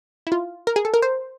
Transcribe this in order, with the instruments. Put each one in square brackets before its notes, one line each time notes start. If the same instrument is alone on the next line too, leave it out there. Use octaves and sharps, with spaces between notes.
[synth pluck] E4
F4
A#4
G#4
A4
A#4
C5